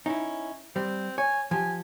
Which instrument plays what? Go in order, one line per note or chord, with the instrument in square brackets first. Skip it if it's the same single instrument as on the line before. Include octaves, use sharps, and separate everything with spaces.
[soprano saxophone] C#4 [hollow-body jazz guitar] D#4 E4
[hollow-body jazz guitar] G3 [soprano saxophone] C4
[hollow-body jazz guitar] C#5 [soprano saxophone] G#5
[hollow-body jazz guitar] F3 G4 [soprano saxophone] G#5